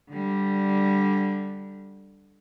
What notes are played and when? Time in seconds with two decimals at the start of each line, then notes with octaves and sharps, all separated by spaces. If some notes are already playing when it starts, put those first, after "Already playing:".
0.11 D3 G3